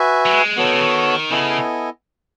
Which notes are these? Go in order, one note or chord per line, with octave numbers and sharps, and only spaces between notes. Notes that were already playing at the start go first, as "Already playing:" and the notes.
Already playing: F#4 B4 E5 G#5
F#3
G#3
E3 B3 F#4 A4 C#5
D#3
C#3
D#3
C#3 B3 E4 A4 D#5 G#5